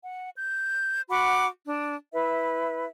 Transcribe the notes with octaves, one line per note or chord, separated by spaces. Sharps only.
F#5
G6
F#4 F#5 B5 D6
D4
E4 B4 E5